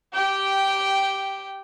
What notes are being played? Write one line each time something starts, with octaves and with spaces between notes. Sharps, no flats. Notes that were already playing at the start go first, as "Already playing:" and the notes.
G4 G5